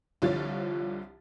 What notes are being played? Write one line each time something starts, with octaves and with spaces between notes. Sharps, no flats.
C2 D3 F3 F4 C#5 A6